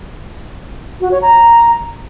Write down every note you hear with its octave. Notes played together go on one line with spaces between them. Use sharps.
F#4
C#5
A#5